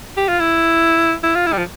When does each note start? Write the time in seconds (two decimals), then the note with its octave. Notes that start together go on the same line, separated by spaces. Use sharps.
0.17 G4
0.29 F4
0.40 E4
1.23 E4
1.35 F4
1.46 E4
1.52 G3
1.58 F3